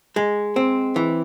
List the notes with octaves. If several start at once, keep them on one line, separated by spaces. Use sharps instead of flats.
G#3
C4
E3